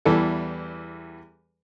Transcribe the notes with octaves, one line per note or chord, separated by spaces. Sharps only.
E2 E3 G3 A4